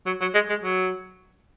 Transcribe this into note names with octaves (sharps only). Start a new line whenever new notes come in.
F#3
F#3
G#3
G#3
F#3